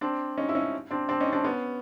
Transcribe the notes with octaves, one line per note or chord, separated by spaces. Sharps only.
C4 D4
C#4 D#4
E4
C#4 D#4
C4 D4
C4 D4
C#4 D#4
C4 D4
B3 C#4